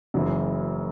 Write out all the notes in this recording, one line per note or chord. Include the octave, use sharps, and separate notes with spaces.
F#1 F#2 C#3 E3